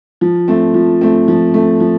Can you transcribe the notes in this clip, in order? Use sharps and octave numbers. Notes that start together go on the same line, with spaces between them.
F3
A3 C4
F3
A3 C4
F3
A3 C4
F3